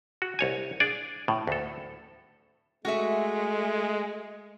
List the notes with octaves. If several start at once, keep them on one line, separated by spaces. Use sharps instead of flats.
F#4
C2 C#5 G#5
D4 G#4 D5 F5 G#5
A2
D2 A4
G#3 A3 F#4 G#4 E5